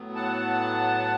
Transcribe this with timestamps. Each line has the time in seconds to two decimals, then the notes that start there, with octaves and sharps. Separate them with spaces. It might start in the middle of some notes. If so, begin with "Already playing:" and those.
Already playing: A2 F#3 B3
0.15 F#5 A5